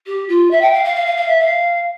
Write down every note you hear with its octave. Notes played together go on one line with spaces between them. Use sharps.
G4
F4
E5
G5
F5
F5
F5
F5
F5
E5
F5